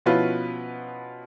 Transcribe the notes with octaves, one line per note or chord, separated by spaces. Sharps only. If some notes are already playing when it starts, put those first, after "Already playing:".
B2 F3 C#4 E4 F4 B4